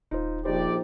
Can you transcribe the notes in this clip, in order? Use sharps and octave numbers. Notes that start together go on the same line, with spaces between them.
D#1 D#4 F4 C5
A#1 D#4 G4 C5 D5